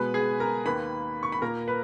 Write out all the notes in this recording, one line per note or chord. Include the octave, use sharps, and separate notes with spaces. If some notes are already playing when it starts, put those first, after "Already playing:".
Already playing: B2 G#3 B3 B4 B5
G#4 G#5
A#4 A#5
D#2 D#3 A#3 B4 B5
C#6
B5
A#2 A#3 A#4 A#5
B4 B5